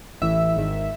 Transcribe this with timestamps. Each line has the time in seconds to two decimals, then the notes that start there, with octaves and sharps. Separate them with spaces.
0.22 A1 A2 E3 E5
0.56 G#1 G#2 D#3